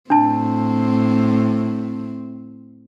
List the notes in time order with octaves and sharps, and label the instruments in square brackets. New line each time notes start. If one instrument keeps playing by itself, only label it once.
[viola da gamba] A2 C4 [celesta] D4 A5